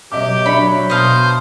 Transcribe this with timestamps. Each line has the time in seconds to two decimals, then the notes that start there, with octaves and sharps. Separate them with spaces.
0.12 B2 F#3 G4 D#5 E5 D6
0.46 F#3 D4 E5 B5 C#7
0.90 B2 C5 D#5 F5 A5